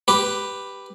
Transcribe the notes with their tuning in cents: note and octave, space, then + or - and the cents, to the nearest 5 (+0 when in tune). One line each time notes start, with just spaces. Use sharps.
G4 +0 B4 +0